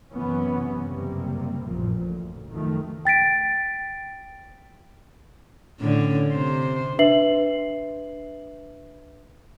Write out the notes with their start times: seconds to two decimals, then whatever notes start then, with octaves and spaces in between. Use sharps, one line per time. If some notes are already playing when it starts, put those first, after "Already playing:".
0.13 F#2 C3 E3 B3 C#4
0.81 F#1 G2 C3 G3 A#3
1.66 A1 F#2 A#2 F3
2.05 D2
2.52 C#2 F#2 D#3 F3 A3
3.05 G5 A6 B6 D7
5.80 A2 D3 C#4
6.32 C3 C5
6.99 D4 B4 E5 C7 F#7